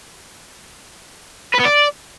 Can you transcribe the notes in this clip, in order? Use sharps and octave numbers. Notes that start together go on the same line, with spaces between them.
B4
B3
D5